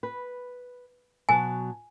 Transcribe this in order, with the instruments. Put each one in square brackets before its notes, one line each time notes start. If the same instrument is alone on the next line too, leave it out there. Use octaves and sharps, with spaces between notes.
[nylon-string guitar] B4
[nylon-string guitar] B2 F#3 A5 [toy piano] G#5